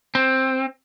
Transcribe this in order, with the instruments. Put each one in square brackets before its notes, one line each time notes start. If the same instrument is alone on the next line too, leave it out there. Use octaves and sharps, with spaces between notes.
[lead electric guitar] C4